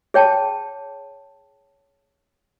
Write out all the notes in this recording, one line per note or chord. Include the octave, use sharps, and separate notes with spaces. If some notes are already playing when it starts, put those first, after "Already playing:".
G#4 C#5 G5 A5